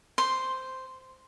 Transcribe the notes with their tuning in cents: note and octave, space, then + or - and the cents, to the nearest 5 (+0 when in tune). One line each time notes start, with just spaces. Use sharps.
C5 -10 C6 +0